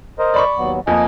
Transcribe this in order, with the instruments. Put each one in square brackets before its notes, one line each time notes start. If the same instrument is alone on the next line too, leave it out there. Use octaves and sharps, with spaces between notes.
[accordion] A#4 C5 D#5
[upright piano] D5 B5 C#6
[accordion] D#2 F#3 B3
[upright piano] F2 A#3 [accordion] D#5 G#5